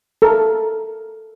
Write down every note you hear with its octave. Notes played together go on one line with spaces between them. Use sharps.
A4 A#4